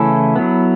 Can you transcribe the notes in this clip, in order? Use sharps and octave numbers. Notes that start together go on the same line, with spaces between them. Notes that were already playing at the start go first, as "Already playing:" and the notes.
Already playing: C#3 E3 A3 C#4 E4 A4
F#3 B3